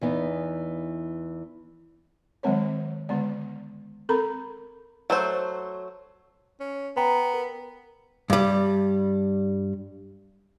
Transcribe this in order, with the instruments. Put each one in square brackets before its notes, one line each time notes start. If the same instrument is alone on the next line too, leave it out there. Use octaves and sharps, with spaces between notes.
[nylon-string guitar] E2 E3 B3 D#4
[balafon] D#3 F#3 G#3 C4 B4 C#5
D3 G#3 B3 D5
C4 A4 A#4 A#5 B5
[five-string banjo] F#3 A3 C5
[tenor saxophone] C#4
[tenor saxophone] B3 [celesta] G5 A#5 B5
[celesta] A#4
[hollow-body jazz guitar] G2 G3